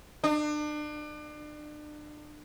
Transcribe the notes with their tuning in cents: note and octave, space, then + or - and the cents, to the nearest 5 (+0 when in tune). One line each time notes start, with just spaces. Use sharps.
D4 +35